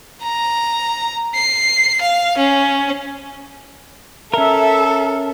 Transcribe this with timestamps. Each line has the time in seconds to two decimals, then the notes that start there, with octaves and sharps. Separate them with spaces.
0.23 A#5
1.35 C7
2.02 F5
2.38 C#4
4.34 C#4 A4 A#4 E5